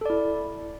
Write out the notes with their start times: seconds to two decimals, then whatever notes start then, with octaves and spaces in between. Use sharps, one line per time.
0.01 A4
0.05 D5
0.10 E4